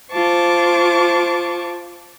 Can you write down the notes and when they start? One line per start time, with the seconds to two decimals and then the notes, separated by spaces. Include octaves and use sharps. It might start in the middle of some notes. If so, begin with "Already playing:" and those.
0.12 F4 C5 A5 C#6 D6